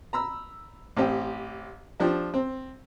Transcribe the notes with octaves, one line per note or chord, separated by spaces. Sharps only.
A#5 B5 E6
A1 C4 G4
F3 D4 G4
C4